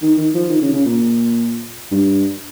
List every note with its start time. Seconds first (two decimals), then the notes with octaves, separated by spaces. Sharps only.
0.02 D#3
0.18 D#3
0.35 F3
0.50 D#3
0.62 C#3
0.73 C#3
0.85 A#2
1.91 G2